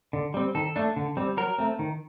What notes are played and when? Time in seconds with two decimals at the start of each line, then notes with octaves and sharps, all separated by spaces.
0.13 D3
0.34 G3 C4
0.55 D#3 A4
0.76 A3 D4
0.96 D3
1.17 G3 C4
1.37 F#3 A#4
1.58 A3 C4
1.79 D#3